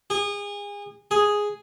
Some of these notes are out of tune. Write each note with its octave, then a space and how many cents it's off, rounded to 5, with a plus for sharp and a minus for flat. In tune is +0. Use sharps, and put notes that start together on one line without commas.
G#4 -30
G#4 +0